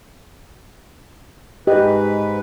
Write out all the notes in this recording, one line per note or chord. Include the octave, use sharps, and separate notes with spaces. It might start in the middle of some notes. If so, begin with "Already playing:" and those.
G#2 G4 B4 D#5